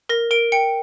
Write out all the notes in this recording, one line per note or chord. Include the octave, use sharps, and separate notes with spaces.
A#4 A#6
A#4 D7
G5 C#7